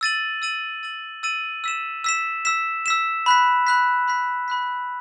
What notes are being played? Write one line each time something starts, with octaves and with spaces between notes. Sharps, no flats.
E6 A6 D#7 F#7
E6 A6 D#7 F#7
E6 A6 D#7 F#7
E6 A6 D#7 F#7
E6 B6 E7
E6 B6 E7
E6 B6 E7
E6 B6 E7
B5 F#6 B6
B5 F#6 B6
B5 F#6 B6
B5 F#6 B6